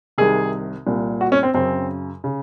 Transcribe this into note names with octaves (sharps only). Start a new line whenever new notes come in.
C2 C3 D#3 G#4
C2 A#2
F#4
C#4
C4
F#2 C#3 C4
C#3